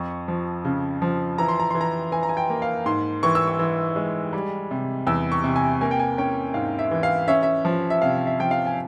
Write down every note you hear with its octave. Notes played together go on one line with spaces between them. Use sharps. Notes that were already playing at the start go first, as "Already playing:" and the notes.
Already playing: F2 C#6
F3
C#3
F3
E3 A#5
C6
A#5
E3 C6
A#5
E3 G#5
A#5
G#5
G5
A#3
F5
G#2 C6
E3 C#6
E6
C#6
E3
G#3
G3
C3
E2 E6
C#6
C3
G#5
A#3 G#5
G5
G#5
C#4 G5
G#2 F5
E5
E3
F5
C#4 E5
E5
F3
E5
C3 F5
E5
F3 G5
F5
G#5